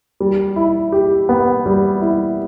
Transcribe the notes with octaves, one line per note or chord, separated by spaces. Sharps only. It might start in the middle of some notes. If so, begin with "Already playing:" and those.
G3
E4
G4
B3
G3
E4